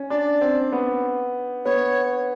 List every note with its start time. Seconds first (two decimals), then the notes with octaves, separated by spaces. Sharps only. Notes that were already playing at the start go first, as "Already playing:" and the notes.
Already playing: C#4
0.10 D4 D5
0.41 C4
0.72 B3
1.65 B3 C#5